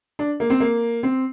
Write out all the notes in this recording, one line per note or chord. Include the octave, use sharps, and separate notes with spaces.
D4
A#3
C4
A#3
C4